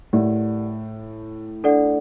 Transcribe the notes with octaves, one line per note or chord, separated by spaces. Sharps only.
A2 G4 A#4 D5 F#5
D4 A4 D5 F#5